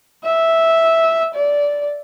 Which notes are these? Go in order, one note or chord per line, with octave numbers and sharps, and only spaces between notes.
E5
D5